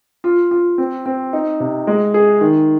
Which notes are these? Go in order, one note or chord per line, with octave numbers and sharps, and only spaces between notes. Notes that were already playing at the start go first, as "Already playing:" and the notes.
F4
F4
C4
C4
D#4
C3
G#3
G#4
D#3